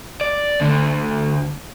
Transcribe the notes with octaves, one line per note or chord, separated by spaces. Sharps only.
D5
D2 D3